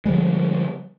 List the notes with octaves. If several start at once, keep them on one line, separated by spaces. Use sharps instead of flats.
D3 F3 G3 G#3